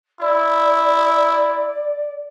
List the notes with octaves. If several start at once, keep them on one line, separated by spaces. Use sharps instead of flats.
E4 D5